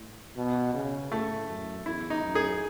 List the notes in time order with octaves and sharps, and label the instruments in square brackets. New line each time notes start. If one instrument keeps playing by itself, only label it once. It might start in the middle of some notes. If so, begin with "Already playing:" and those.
Already playing: [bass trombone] A2
B2
C#3
[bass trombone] A2 [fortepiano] A3
[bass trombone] F#2
[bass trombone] E2 [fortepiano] E4
[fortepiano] D#4
[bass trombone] F#2
[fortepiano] G#4